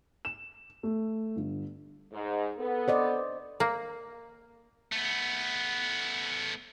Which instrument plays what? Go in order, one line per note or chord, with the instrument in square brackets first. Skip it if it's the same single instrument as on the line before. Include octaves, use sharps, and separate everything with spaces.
[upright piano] E7
A3
G1
[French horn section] G#2
B3 A4
[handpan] C5 D5 D#5
[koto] A#3
[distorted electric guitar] A3 B3